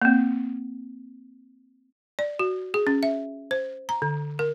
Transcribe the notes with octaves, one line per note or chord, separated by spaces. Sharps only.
A#3 C4
D5
F#4
G#4
C#4
E5
C5
A#5
D3
A#4